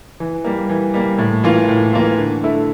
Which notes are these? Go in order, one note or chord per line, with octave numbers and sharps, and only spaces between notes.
E3
G3 A#3
E3
G3 A#3
A2
E3 A#3 F4
A2
E3 A#3 F4
D3
A3 E4